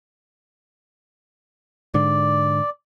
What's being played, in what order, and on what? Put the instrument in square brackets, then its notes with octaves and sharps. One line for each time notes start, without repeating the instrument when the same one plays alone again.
[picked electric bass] G#2 D3 [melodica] D5